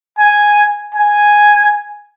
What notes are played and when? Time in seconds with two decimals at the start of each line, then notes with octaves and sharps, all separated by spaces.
0.19 G#5
0.95 G#5